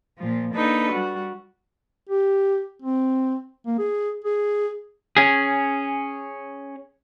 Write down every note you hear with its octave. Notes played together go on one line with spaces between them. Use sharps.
A#2 F3
A#3 D4 D#4 A4 B4
G3 F#4
G4
C4
A#3
G#4
G#4
C#4 G#4